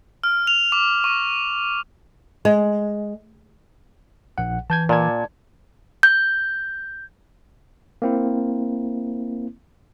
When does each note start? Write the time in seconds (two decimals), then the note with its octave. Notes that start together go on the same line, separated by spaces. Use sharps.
0.24 F6
0.47 F7
0.72 D6
1.04 C#6
2.45 G#3
4.38 A#1 F#5
4.70 E3 A5 G6 G#6
4.89 A#2 D5 A5 G#6
6.03 G6
8.02 A#3 C4 E4